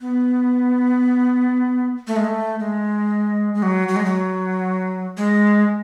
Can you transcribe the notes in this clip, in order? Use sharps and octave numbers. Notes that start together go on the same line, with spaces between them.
B3
A3
G#3
A3
G#3
G#3
F#3
F#3
G#3
F#3
G#3